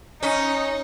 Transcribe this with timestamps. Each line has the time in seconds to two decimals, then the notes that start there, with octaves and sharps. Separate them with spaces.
0.23 C#4 D#4